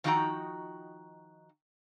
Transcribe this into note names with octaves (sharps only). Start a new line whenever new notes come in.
D#3 F3 D#4 F#4 G5 A#5